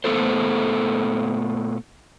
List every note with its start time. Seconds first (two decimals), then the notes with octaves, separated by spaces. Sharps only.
0.04 A#2 A3 B3 F4 A4 C5